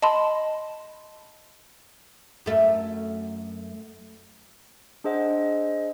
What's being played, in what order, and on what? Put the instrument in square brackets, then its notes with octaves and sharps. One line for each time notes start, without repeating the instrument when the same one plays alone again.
[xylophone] D#5 A5 B5 C6
[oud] F#2 A3
[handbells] D4 G#4 C5 D#5 F#5